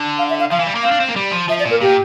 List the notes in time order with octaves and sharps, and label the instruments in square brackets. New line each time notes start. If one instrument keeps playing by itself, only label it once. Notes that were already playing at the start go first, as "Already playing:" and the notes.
Already playing: [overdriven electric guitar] D3
[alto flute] F5
E5
F5
[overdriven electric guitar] F3 [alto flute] F5
[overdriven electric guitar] E3
G3
A#3
[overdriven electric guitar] C4 [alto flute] F5
[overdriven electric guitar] D4
C4
A#3
G3
F3
[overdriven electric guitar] F3 [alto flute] E5
[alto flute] D5
[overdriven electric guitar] A#2
[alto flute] A#4
[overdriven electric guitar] A#2 [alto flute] G4